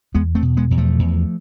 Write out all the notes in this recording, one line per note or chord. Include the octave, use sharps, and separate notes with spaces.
E2 G#3 B3
A3 C4
B2
G#3 B3
E2
F3 A3
E2